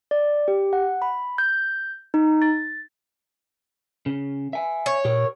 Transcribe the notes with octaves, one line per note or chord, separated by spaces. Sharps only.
D5
G4
F#5
B5
G6
D#4
A6
C#3
E5 G#5
C#5
A#2 G4 A#4